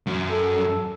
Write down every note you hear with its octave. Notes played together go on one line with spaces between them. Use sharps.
F#2
A4